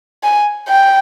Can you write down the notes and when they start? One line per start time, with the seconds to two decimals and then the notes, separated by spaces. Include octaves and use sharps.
0.23 G#5
0.69 G5